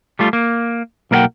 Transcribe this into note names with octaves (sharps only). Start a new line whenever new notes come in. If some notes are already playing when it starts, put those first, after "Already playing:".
G3 A3 F4
A#3
B1 A#3 A#4 C#5 F#5 G5